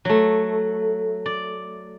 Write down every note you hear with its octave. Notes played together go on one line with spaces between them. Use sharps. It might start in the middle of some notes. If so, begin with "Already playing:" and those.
F#3 A3
D5